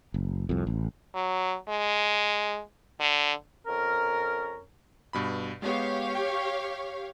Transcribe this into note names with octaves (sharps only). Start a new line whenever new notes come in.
F#1
C2 F2
A1
F#3
G#3
D3
F2 C#4 A#4
G2 B2 B5
G#3 B3 G4 C#5 F5
G5